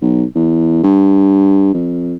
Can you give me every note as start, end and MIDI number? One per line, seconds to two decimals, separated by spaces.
0.01 0.24 35
0.35 0.82 40
0.83 1.70 43
1.74 2.15 41